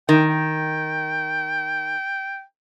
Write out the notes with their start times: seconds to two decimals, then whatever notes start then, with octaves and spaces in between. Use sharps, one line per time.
0.09 D#3 G5
0.30 G5